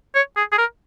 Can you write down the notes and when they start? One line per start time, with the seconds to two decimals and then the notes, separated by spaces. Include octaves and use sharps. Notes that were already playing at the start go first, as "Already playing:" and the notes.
0.15 C#5
0.36 G#4
0.52 G#4
0.58 A#4